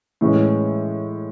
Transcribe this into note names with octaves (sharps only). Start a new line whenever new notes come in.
A2 E3 G#3 C#4